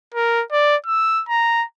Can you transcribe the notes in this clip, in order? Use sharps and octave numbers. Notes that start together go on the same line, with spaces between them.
A#4
D5
E6
A#5